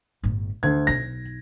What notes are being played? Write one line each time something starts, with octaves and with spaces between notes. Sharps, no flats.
G1 A2
D2 D#3 G#6
B1 D#4 A#6